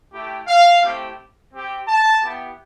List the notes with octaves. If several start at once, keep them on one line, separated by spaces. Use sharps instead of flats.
A3 E4 G4
F5
A3 C4 E4 G4
C4 G4
A5
B3 E4 G4